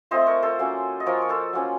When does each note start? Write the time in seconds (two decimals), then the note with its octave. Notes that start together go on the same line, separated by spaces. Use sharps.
0.11 A3 C4 F4 C5 D#5
0.27 A#4 C#5
0.42 A4 C5
0.59 F#3 A#3 C#4
1.00 D#5
1.06 F3 A#3 F4 A#4 C#5
1.22 C#5
1.29 A4 C5
1.53 F#3 A#3 C#4 F4